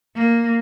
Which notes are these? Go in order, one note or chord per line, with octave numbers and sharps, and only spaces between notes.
A#3